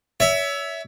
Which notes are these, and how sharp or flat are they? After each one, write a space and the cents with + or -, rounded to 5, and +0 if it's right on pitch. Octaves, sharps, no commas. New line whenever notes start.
C#5 +30 E5 +0